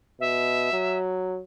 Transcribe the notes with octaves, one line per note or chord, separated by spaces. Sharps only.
B2 E5
F#3